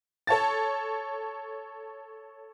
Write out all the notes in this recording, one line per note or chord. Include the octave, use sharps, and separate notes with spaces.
A4 C#5 A5 A6